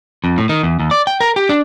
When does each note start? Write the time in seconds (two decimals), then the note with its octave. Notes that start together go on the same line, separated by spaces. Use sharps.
0.24 F2
0.38 A2
0.49 D#3
0.63 E2
0.80 D#2
0.91 D5
1.07 G5
1.20 A#4
1.36 G4
1.49 D4